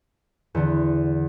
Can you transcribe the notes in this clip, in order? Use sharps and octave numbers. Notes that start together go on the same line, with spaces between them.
E2 D3